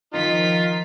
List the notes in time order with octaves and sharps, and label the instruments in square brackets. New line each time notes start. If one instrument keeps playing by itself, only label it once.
[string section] D#3 F3 B6 [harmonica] D#4 [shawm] F4